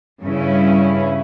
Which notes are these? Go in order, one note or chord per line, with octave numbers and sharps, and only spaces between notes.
G2 C#3 C#4 E4